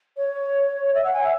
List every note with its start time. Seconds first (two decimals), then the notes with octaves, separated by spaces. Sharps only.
0.17 C#5
0.94 E5
1.04 F#5
1.13 G#5
1.24 E5